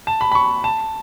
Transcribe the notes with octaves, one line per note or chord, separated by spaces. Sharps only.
A5
B5
B5
C#6
A5